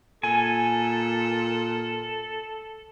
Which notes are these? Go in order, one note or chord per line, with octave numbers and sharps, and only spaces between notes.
A#2 A4 G#5